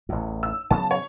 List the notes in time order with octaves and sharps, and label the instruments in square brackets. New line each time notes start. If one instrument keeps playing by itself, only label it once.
[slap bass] A1 E2
[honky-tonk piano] E6
[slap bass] C#3 F#3 B3 [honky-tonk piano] A5
[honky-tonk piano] C#5